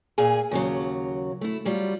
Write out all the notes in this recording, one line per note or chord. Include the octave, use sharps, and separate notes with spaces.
A#2 G#4 F5 G#5
D#2 C#3 F#3
A3 E4
F#3 G3 F4